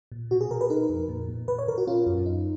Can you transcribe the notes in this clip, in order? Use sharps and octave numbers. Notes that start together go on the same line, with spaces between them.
A#2
B2 F#4
G#4
B2 A#4
B4
D#4 A#4
F2
A#2
A#2
A#2 B4
C#5
A#2 A#4
F#4
C#4 F4
F#2
D#4